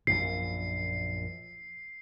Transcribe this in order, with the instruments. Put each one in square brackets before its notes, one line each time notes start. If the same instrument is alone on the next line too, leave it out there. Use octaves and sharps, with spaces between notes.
[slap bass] A#1 F#2 A#2 [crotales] C7